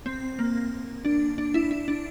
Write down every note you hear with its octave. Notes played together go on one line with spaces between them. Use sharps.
C4
A#3
D4
D4
E4
E4
D4